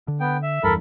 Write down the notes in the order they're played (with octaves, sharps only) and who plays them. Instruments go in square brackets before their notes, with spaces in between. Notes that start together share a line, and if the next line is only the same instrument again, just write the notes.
[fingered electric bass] D3
[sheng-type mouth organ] B3 G5
E5
[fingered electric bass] E2 G2 [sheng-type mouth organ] A4 A#4 B5